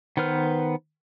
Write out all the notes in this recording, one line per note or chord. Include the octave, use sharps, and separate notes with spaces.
D#3 B3 B4 C5 F6